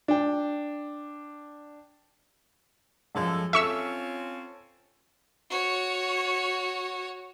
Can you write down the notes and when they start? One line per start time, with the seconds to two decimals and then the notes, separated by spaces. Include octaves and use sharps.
0.08 D4 G5
3.15 F#2 F3 G#3 A4
3.53 C4 C#4 F4 A4 E5 C#6 E6
5.50 F#4 C#5